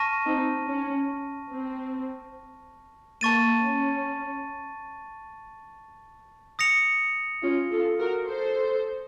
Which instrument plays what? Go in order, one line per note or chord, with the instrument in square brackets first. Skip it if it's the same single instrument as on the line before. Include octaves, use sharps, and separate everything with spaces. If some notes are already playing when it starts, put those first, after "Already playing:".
Already playing: [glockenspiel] A5 C#6 F6 A#6 D#7
[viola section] C4 D#4
C#4
C4
[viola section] A#3 [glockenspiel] A5 C#6 A6 D#7
[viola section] C#4
[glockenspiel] D#6 A#6 C#7 F7
[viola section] C#4 F4
F4 A4
F#4 A#4
A4 C5